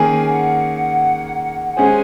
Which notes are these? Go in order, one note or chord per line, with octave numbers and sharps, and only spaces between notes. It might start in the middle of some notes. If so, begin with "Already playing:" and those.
Already playing: D#3 A#3 C#4 G#4 G#5
F#5
G#3 C#4 G#4 C5 G#5